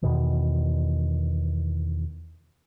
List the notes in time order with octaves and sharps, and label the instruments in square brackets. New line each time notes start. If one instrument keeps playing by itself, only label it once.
[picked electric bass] E2 B2 D#3